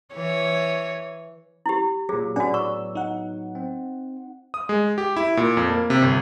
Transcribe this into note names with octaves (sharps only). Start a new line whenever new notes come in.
E3 C#5
E4 G4
A#2 F#3 G#4
A2 F#3 B3 D4 F#4 D5 F#5
D5 C#6 E6
D#4 F#5
C4
D#6
G#3
G4
E4
A#2
F2
A#3
C3
G1